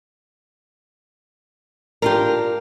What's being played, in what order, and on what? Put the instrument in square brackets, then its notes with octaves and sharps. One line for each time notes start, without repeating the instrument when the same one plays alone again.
[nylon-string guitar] D4 F4 G4 [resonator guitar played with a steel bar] A#4